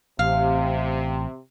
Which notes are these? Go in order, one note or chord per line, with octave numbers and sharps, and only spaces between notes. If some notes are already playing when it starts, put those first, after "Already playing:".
A1 C3 F5